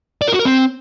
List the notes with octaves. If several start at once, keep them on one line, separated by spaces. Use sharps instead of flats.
D5
A#4
F#4
A#4
C4